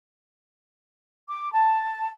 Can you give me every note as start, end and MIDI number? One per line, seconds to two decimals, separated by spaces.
1.27 1.52 86
1.53 2.08 81